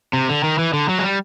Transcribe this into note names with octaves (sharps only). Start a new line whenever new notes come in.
C3
D3
D#3
E3
D3
F#3
G#3
G3